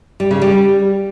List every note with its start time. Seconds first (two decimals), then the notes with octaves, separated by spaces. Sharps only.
0.20 G3
0.31 C#3
0.42 G3